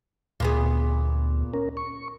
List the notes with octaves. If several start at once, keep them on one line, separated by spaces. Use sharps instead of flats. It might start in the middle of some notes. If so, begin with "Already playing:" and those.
D2 A#2 B3 G#4
C#4 A#4
C#6